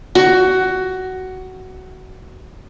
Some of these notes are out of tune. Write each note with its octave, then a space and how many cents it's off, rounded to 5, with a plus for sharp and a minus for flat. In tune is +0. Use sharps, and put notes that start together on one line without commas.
F#4 +15